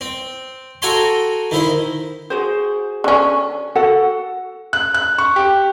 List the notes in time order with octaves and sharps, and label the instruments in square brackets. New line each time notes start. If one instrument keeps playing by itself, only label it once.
[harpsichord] C4
F#4 A4 G5 G#5 A#5 C6
D#3 E4 C5
[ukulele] F#4 G#4 C5
[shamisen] D3 C#4
[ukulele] F#4 A4 F#5
[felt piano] F#6
F#6
C#6
G4